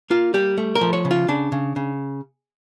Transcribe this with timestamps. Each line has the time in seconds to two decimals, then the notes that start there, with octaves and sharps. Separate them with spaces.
0.10 A#3 F4
0.34 G3 G4
0.58 A3
0.75 A#4
0.81 F3
0.93 C#5
1.05 C#3
1.11 F4
1.28 C#3 D4
1.52 C#3
1.76 C#3